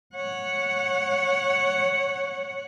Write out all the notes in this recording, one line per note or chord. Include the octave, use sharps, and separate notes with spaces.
C#5 F#5